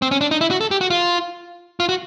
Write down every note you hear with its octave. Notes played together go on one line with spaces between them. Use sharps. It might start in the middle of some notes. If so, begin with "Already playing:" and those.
C4
C#4
D4
D#4
E4
F#4
A4
G4
F#4
F4
F4
F#4